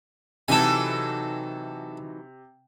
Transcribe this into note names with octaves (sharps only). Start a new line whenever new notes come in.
C3 E3 F#3 D#4 A4 G#5